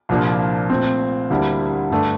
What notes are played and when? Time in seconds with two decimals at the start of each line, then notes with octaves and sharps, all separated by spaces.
0.09 C2 A#2 F3 A#3 D4
0.70 A#2 A3 C4
1.30 D2 D3 G3 A#3 E4
1.91 G2 D3 A3 D4 A4